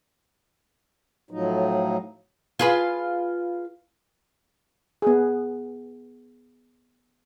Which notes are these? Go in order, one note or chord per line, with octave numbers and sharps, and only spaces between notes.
A2 F3 F#3 D#4
F4 G#4 B4
B3 G#4